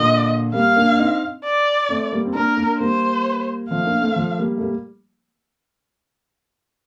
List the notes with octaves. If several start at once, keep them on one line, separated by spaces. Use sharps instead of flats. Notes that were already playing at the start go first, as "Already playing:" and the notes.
Already playing: A#2 D3 D#5
G3 A#3 F5
A#3 D4
D4
C4 D#4
D5
A3 C4
G3 A#3
C4
A#3 D4 A#4
A#3 D4
G3 A#3 C5
F3 A3 F5
A#3 D4
A3 C4
F3 A3
G3 A#3
A3
G3 A#3